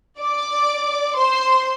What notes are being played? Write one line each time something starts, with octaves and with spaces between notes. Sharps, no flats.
D5 D6
C5 C6